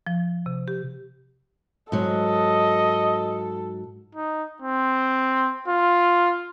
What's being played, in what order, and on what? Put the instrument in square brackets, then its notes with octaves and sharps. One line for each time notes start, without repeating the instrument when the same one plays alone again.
[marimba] F3
C3
G4
[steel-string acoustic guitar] G#2 F#3 [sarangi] A4 [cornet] D#5
[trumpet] D#4
C4
F4